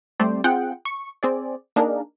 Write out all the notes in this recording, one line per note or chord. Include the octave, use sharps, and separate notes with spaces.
G3 A3 C4 G4 C5 D5
C4 F4 G#4 F#5 G5
C#6
C4 G#4 D5
A#3 D4 D#4 G#4 A#4